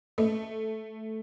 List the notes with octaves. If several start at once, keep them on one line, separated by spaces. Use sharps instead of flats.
A3